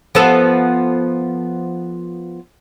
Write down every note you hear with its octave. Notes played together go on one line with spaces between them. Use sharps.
F3 B3 A4